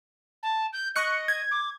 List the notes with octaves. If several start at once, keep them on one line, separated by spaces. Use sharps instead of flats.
A5
G6
D#5 C#6 F#6 C#7
G#6
D6